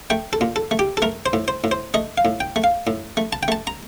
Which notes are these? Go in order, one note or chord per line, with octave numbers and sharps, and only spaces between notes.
A3 G5
A4
A#2
A4
A3
G4
A4
A3 A#4
C5
A2
C5
A2
C5
A3 D#5
F5
A2
G5
A3
F5
A2
A3
A5
G5
A3 A5
A#5